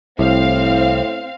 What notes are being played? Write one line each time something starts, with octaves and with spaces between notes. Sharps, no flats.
C2 A2 C4 F5